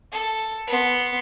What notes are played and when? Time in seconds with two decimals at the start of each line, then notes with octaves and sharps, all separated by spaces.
0.12 A4
0.67 B3 C6